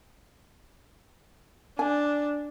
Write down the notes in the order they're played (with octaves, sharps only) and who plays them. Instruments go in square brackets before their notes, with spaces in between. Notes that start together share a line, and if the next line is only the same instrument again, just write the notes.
[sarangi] D4 [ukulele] G#5